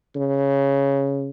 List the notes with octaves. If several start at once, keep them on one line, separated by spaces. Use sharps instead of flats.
C#3